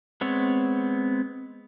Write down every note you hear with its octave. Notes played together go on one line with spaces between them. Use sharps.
G#3 B3 C4 C#5